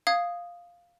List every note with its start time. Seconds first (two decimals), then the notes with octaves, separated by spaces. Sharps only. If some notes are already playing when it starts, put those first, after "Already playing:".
0.07 F5 D#6 G#6